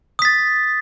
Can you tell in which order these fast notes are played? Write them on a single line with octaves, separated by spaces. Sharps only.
D#6 B6 A6